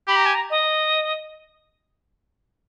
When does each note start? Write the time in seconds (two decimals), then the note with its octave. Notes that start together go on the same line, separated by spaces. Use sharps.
0.08 G4 B5
0.16 A#5
0.26 G#5
0.35 A#5
0.50 D#5